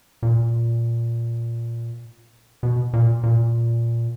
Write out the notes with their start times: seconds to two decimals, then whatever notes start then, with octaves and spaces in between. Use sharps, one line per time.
0.23 A#2
2.63 B2
2.93 A#2
3.23 A#2